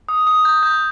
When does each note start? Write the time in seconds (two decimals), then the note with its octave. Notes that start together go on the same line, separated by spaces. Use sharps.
0.09 D#6
0.27 D#6
0.45 G6
0.63 G6